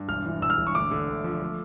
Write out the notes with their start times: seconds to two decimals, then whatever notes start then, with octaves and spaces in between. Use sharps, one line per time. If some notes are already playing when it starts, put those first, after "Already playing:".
Already playing: G2
0.08 E1 F6
0.26 E3
0.41 E1 E6
0.50 F6
0.58 E1
0.67 C#6
0.75 D2 D6
0.91 D3
1.08 D2
1.24 F3
1.42 A3